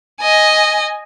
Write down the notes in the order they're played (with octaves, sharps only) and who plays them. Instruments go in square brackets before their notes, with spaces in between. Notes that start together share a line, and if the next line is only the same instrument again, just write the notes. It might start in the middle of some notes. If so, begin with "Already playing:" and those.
[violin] D#5 G#5